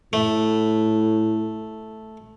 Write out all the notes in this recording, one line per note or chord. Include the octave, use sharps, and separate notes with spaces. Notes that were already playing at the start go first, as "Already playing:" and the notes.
A2 A3